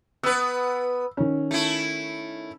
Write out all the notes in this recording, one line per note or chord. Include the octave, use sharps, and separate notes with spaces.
B3 B4 E6
D#3 C#4
A3 E4